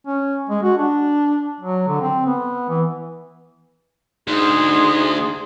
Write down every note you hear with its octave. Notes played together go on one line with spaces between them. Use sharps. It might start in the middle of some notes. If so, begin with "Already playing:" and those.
C#4
G#3
F#4
D4
F#3
D3
C4
B3
E3
D2 D#4 G#4 C6